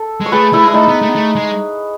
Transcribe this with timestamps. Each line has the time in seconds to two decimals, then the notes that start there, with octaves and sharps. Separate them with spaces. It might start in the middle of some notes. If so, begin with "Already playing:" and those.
Already playing: A4
0.21 G#3
0.26 C#5
0.32 A3 G#4 B4
0.53 A3 E4
0.64 G#3 E4
0.74 A3 D#4
0.88 B3
1.02 A3
1.09 B3
1.15 A3
1.36 G#3